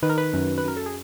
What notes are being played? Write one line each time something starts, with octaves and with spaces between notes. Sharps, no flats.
D#3 B4
A#4
B4
F#2
B4
F#2 A#4
A4
G#4